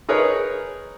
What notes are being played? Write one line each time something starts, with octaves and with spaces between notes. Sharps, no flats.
D#4 G#4 A#4 B4 C#5